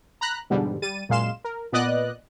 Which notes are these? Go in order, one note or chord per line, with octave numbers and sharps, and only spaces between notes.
A#5 B5 F#6
E2 G#2 B2 D3 G3
G3 A6 D#7
F#2 A#2 G#3 F5 C6 E7
A#4
A#2 B3 D5 D#5 F#6